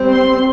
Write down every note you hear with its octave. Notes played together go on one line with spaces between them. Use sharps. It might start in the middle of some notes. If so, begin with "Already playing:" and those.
Already playing: G3 C4
C6